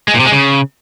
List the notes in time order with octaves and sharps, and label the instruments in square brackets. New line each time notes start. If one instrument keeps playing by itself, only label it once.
[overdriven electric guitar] G#3
A#2
C3
G#3
C#3